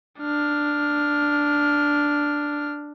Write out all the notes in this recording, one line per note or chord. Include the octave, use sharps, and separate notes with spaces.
D4 F6